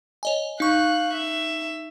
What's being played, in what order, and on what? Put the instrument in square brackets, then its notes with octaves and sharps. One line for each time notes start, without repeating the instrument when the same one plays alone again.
[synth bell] C#5 D#5 G#5
[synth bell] D#4 C#6 [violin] F5 F#6
[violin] E5